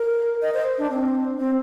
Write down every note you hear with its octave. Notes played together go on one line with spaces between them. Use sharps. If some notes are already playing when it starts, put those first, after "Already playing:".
Already playing: A#4
D#5
C5
D4
C4
C4